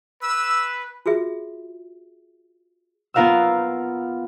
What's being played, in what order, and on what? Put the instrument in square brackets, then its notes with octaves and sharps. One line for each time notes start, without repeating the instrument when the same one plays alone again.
[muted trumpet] B4 [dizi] E6
[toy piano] F4 F#4 G#4 E5
[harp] B3 F4 A#4 F5 F#5 E6